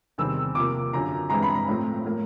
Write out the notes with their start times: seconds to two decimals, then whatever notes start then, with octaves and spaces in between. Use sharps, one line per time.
0.18 E2 C3 D#3 G3 C4 E6
0.55 C3 F3 A#3 D6
0.93 F#2 D3 F3 A#5
1.30 G2 E3 G#3 C4 A#5
1.43 B5
1.55 A#5
1.68 A2 F3 A3 C4
2.05 A2 F3 A#3